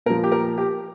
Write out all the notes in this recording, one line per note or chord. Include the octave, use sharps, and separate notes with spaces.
A#2 F3 A#4
G4
A#4
G4